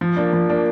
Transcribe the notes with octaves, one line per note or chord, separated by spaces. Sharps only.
F3
A#3 D4
F3
A#3 D4